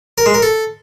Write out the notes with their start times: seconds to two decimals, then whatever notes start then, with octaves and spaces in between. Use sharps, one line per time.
0.18 A#4
0.26 G#3
0.34 A#4
0.42 A4